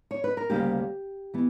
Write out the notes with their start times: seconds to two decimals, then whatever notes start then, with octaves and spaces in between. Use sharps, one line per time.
0.11 C#5
0.24 B4
0.37 A#4
0.50 D2 C#3 G3 A#3 G4
1.34 E3 B3